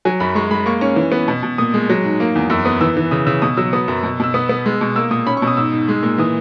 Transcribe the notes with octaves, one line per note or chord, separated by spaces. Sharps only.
F#3 G#5
F#2 B5
G#3 C#6
G#3 B5
A#3 C#6
C#4 C#6
E3
B3
B2
B2
A#2 D#6
G#3
F#3
G#2
A#3
E2
F#2 E6
B3 D#6
E3 E6
E3
C#3 D#6
C#3 E6
B2 D#6
F#3 E6
B3 D#6
F#2
B2
B2 E6
B3 D#6
B3
G#3
B2
A#3 E6
A#2 D#6
C#4 B5
C#6
B2
D#6
G#2 E6
G#2
G#3
A#2
E3 D#6